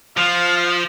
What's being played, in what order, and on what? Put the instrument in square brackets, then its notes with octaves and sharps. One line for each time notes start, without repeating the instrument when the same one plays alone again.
[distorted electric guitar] F3 [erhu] F5